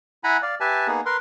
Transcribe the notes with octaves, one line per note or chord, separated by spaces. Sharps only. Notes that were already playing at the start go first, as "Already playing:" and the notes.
E4 F#5 G#5 A#5 B5
D5 F5
G4 B4 E5 G#5 A5
A#3 B3 D#4 G#4
A#4 B4 C6